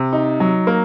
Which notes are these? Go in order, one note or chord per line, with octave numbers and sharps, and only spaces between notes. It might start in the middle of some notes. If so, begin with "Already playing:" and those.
Already playing: C3
D#4
F#3
A#3